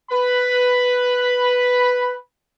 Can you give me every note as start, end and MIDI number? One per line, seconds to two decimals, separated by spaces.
0.11 2.14 71
0.11 2.14 83